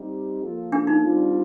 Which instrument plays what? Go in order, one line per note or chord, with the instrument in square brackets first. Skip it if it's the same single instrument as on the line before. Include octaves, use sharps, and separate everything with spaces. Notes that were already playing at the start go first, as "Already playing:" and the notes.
Already playing: [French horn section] G3 C4 D#4 G4
F3 A#3 F4 A4
[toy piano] D4
D#4
[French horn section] D3 G3 C4 F4